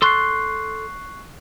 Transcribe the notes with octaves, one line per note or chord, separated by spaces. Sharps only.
A4 C6 C#6 F#6 C7